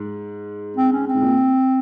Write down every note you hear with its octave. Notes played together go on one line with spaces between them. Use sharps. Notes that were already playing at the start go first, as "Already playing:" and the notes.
Already playing: G#2
C4
C#4
C4
G#2
A#2